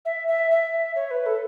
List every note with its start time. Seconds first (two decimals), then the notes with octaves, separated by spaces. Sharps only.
0.05 E5
0.28 E5
0.51 E5
0.96 C#5
1.11 B4
1.26 A4